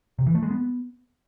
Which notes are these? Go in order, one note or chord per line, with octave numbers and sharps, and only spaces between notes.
C3
E3
A3
G#3
B3